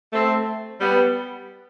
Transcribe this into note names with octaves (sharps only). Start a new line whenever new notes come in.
A3 C4
G3 B3